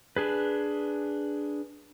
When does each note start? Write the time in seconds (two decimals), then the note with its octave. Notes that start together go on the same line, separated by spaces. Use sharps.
0.16 D4 G#4 B4